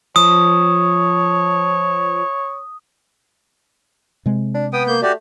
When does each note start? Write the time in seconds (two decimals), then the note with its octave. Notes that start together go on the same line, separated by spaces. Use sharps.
0.16 F3 C#5 D#6
4.26 C3 G#3
4.54 D4
4.73 B3 G5 D#6
4.87 A#3 G6
5.02 A3 F#4 G4 D5